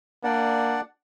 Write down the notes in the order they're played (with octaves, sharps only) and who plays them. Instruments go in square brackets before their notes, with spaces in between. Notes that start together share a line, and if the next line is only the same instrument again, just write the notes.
[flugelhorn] A#3 [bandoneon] D4 D5 F#5